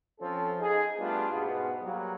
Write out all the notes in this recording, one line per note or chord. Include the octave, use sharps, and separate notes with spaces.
F3 C4 C#4 A4
D#4 G#4
G3 A3 B3 D4 F4
G#2 B2 G#3 B3 F4 G#4
F#3 G3 A#3